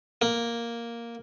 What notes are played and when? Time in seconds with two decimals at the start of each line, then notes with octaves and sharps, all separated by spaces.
0.22 A#3